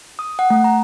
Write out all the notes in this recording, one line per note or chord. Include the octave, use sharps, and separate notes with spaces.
D#6
F#5
A3
A#5